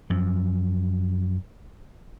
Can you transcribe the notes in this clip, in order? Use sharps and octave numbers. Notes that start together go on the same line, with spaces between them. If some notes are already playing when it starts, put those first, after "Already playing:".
F#2 F3